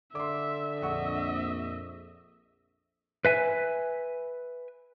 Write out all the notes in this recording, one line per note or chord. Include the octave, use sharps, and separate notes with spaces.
D3 E5 C6 D6
A#1 F2 D#5 E5 F#5 C#6
B4 E5 G#5